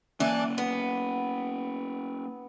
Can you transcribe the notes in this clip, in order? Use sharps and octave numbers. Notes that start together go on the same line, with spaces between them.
E3 A#3 C#4 D4
B3